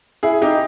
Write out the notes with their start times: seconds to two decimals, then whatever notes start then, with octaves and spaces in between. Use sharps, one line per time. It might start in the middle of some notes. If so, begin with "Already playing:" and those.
0.23 E4 G#4
0.42 D#4 G4